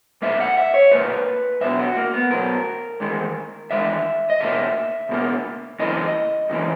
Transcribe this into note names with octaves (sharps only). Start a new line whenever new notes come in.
B1 A#2 A#3 E5
F#5
E5
C#5
B1 A#2 A#3 B4
B1 B2 F#3 E5
F#4
A#3
B3
B1 B2 F#3 A#4
E2 D#3 G#3
E2 D#3 G#3 E5
D#5
C#2 B2 A#3 E5
C#2 B2 A#3
F#2 C#3 E3 A#3 D#5
F#2 C#3 E3 A#3